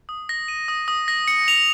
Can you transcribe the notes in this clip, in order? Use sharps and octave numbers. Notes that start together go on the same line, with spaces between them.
D#6
A#6
D#7
D#6
D#6
A#6
C#7
F7